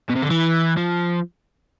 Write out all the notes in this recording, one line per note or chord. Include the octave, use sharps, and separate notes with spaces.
B2
C3
D3
E3
F3